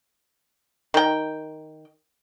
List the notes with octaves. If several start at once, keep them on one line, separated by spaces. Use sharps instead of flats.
D#3 G5